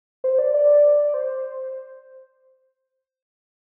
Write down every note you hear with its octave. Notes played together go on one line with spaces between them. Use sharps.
C5
D5
D5
D5
C5